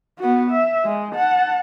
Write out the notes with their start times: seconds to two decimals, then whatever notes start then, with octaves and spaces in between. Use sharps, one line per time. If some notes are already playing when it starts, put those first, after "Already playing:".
0.19 B3 F#4
0.51 E5
0.84 G#3
1.14 F#5 A5